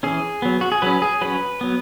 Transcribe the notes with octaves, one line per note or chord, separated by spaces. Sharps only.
E3 C#4 G#4
F#3 B3
F#4
G#4
F#3 C#4 B4
G#4
F#3 C#4 B4
F#3 B3